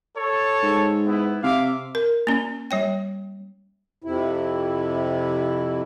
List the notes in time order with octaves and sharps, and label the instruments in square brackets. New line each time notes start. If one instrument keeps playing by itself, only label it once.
[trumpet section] A4 C#5 A5
[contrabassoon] G#2
[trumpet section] B3 E4
[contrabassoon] C3 [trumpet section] E5 F5 D6
[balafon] A#4
A#3 C#4
G3 C#5 G5
[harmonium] F2 C3 E4